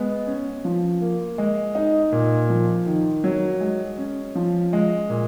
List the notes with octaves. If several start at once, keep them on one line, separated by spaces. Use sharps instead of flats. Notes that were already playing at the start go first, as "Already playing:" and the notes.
Already playing: G#3 B3
C#4
F3
A#3
G#3
D#4
A#2
F3
D#3
F#3
G#3
C#4
F3
G#3
A#2